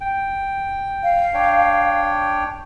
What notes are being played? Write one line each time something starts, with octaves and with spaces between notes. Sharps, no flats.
G5
F5
D4 C#5 G5